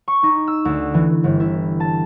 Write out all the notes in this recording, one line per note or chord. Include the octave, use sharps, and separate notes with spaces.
C#6
D#4
E6
D2
E3
G1
E4
A5